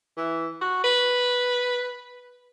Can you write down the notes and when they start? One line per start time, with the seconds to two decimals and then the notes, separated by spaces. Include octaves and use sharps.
0.17 E3
0.61 F#4
0.84 B4